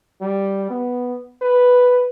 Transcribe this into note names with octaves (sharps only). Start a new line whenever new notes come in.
G3
B3
B4